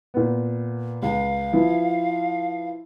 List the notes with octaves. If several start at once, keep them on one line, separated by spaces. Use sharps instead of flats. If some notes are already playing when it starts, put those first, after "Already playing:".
A#2 B3
C#2 F5
F3 E4 B4